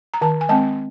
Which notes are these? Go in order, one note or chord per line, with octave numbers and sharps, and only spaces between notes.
A#5
D#3 A5
G#5
G#3 C4 A5